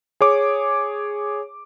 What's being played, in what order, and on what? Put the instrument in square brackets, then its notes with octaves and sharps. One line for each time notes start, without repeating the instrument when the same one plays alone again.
[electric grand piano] G#4 C#5 D6